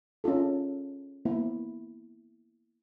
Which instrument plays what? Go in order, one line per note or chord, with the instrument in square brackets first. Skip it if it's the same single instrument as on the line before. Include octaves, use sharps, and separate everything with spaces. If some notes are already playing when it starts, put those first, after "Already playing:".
[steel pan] C#4 D#4 F4 A4
A#3 B3 E4